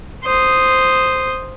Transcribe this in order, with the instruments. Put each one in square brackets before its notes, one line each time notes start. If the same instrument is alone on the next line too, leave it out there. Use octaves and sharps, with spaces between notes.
[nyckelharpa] C5 D#6